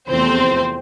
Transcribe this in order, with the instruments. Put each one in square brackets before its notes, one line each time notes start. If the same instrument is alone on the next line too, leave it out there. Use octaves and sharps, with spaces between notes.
[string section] E2 C3 F3 A3 C4 C5